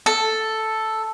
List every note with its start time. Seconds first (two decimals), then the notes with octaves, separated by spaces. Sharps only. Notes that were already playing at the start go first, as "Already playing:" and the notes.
0.06 A4